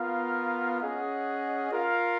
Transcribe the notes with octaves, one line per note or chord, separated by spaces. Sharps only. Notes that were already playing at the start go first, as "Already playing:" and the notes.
Already playing: B3 F4 A#4 F5
C#4 G#4 D#5 F#5
F4 A#4 F5